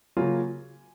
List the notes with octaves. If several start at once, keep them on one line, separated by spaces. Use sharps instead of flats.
C#3 F#3 A#3 C#4 F4 G#5